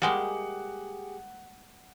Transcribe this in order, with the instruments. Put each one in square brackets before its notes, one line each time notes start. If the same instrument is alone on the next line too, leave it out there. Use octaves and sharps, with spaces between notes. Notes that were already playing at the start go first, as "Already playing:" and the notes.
[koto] G3 G#3 A#3 [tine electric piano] G4 G#4 [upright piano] F#5